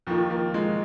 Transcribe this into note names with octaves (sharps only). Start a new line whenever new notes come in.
D#2 D#3 F3
F3 A#3
G#3